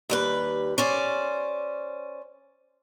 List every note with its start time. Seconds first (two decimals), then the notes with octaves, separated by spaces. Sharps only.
0.10 D#2 G3 B4
0.78 C#4 C5 D5